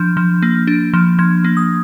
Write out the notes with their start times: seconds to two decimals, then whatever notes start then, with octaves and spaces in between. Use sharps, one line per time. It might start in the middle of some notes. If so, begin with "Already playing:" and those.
Already playing: F3 D4 G6
0.17 F3
0.42 A#3
0.67 D4
0.93 F3
1.19 F3 G#6
1.44 A#3
1.57 D#6